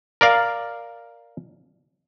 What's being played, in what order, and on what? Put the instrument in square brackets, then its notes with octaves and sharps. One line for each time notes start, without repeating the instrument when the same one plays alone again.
[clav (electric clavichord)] A#4 D5 F5